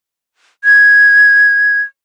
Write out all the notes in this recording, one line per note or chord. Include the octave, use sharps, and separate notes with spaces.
G#6